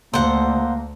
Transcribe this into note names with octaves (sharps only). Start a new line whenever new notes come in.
D2 A#3 C5 F#5